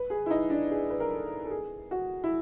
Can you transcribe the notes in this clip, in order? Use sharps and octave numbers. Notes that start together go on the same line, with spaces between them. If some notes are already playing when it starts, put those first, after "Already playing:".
Already playing: B4
G#4
E4
D#4
D4
G#4
B4
A#4
A4
A4
G#4
F#4
E4